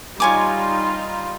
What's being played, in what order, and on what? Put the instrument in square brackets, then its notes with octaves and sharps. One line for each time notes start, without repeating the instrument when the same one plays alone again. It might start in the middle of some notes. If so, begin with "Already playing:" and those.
[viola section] G3 D#4 F4 [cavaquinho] C#5 G#5 D6